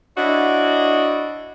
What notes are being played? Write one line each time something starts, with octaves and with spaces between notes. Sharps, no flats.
D4 E4 F#4 C#5 D#5